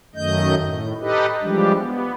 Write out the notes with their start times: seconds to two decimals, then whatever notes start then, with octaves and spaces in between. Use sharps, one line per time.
0.15 F#2 D#3 A3 D#5 G6
0.64 A2
1.00 D#4 G4 A4 B4 D#5
1.42 E3 F3 G3 G#3 D4 G4
1.77 B3